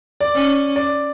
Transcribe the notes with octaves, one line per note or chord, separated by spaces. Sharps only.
D5
C#4
D5